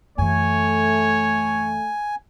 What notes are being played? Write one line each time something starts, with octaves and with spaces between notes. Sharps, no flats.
F#2 E3 A3 C#5 G#5